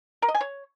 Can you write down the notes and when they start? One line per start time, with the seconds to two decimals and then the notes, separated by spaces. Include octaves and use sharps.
0.22 A#4
0.28 D#5
0.35 G#5
0.41 C#5